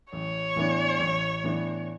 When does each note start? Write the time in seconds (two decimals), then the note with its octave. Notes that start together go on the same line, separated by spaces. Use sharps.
0.12 A1 C#5
0.56 A2 E3 B3 D4
1.00 A1
1.44 A2 E3 B3 D4